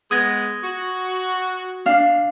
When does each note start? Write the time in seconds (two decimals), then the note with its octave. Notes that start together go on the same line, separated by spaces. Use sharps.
0.11 G#3 B3 D#6 G#6 A#6
0.63 F#4
1.86 D4 F5